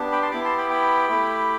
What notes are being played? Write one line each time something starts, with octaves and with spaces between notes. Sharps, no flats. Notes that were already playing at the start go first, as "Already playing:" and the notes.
Already playing: B3 D4 G4
G5 B5
A5 C6
B3 E4 G4 B5 D6
A5 C6
G5 B5
G5 B5
A3 E4 G4